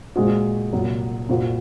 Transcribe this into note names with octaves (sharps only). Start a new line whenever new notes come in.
A#2 G#3 C4 F#4
C2 A#2 F#3
C2 A#2 F3 C4 F#4